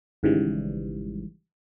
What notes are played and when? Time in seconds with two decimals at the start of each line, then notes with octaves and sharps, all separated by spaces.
0.23 G#1 G#2 C#3 E3 G3